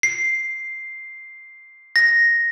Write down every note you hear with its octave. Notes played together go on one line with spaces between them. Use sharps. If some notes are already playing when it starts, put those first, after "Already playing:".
C7
A#6